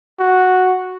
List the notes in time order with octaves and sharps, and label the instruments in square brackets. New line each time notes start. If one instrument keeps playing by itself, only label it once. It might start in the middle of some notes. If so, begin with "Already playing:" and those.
[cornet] F#4